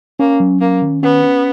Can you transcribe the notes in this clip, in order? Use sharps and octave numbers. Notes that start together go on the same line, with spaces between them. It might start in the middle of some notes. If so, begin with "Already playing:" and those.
A#3 C#4
F#3
A#3 C#4
D#3
B3 C#4
C#4